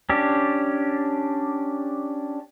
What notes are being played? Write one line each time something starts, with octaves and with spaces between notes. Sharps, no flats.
C#4 D4 G4